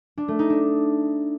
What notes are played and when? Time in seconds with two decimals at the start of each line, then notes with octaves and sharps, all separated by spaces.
0.17 D4
0.28 A3
0.39 D#4
0.50 D4